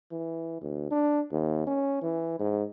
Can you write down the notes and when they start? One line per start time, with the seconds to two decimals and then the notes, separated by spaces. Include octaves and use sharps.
0.12 E3
0.62 D2
0.91 D4
1.32 D#2
1.67 C#4
2.02 E3
2.39 G#2